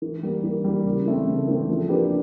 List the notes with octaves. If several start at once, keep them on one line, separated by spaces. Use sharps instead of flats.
E3
G3 A#3
E3
G3 A#3
C#3
E3 A3 C4
C#3
E3 A3 C4
F3
A#3 D4 G4 B4